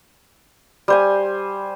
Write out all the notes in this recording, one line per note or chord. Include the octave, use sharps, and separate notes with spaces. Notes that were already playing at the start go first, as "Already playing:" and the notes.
G3 C5 G#5